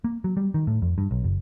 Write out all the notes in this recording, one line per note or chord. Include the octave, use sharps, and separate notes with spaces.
A#3
F#3
G3
D#3
A2
F2
G2
B1
F#1